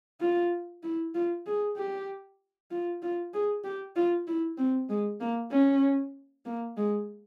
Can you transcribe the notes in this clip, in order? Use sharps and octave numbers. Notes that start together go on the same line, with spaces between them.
F4
E4
F4
G#4
G4
F4
F4
G#4
G4
F4
E4
C4
G#3
A#3
C#4
A#3
G#3